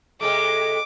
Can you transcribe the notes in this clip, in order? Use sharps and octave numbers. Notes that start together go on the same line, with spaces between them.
C3 G#3 A3 D6